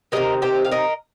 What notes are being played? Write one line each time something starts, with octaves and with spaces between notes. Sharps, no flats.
C3 D#3 G3 A#3 A#4 D#5
G4 C5
F5
A#4 D#5